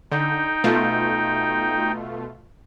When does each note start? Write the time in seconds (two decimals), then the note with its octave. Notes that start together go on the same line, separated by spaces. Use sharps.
0.12 D3 D#4 G5
0.64 B2 A3 F4